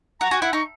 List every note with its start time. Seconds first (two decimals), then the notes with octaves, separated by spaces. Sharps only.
0.20 F#4 A#5
0.31 F#4 G#5
0.41 E4 F#5
0.53 D#4 C#6